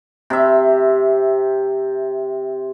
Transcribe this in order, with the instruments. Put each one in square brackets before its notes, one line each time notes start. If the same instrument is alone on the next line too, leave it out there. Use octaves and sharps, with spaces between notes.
[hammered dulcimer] C3 E5